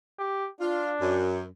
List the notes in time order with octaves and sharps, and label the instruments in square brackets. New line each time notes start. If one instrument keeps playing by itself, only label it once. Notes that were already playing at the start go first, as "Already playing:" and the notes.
[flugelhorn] G4
[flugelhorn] D4 [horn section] F4
[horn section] F#2